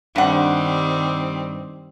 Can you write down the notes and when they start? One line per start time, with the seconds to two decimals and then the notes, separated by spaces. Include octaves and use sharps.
0.16 G2 D#3 G3 C4 F#5